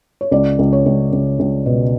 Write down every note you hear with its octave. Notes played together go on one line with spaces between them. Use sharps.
C#5
C#2 D5
C#2
C#5
C#2
C#2
C#2
B2